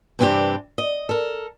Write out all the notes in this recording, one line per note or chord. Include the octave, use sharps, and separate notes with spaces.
G2 C3 E3 C4 D4 G4
D#5
A4 A#4